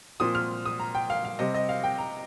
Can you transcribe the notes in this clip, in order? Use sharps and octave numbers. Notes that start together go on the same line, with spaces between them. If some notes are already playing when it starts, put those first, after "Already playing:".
A#2 F3 C4 D#6
F6
D#6
A#5
G5
F5
F5
C3 G3 C4 D#5
D#5
F5
G5
A#5